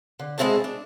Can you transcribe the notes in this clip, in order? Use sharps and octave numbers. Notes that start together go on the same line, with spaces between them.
D3
G#3 A#3 C4 E4 F#4 A4
D4